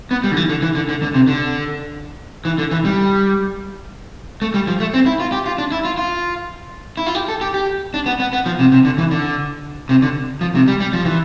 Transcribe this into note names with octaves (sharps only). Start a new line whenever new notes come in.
B3
G3
D3
E3
D3
E3
D3
D3
D3
C3
D3
E3
D3
E3
G3
A3
G3
F3
A3
C4
E4
F4
G4
F4
D4
E4
F4
F4
E4
F4
G4
A4
G4
G4
D4
B3
B3
B3
F3
C3
C3
D3
E3
D3
C3
D3
F3
C3
G3
G3
F3
E3